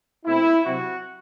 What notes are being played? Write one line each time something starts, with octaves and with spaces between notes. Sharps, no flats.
B2 A3 C4 E4
C3 F#3 C4 F#4